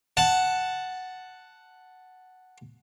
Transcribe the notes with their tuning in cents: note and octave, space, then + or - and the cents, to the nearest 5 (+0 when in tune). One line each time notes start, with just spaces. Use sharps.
F#5 +0 A5 +0